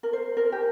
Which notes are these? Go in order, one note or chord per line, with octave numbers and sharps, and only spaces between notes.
A#4
C5
A#4
G4